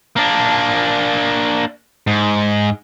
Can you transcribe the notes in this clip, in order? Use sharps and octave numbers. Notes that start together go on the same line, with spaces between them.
A#3 D4
G#2